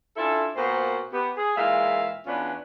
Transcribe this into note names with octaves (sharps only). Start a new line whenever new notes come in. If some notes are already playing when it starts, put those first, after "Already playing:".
C#4 D4 E4 F4 A4
A#2 A#3 B3 F#4 C5
B3 G4
G#4
A#2 E3 G#3 E5 F5
E2 B3 C#4 D4 F4 B4